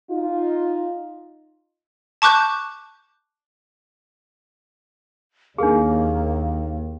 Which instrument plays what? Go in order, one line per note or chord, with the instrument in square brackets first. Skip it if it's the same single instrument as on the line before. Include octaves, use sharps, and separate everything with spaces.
[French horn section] D#4 F4
[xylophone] A5 C#6 D6 F#6 G6
[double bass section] D#2 [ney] A#3 [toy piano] D4 G#4 [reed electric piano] D#4 A#4 F5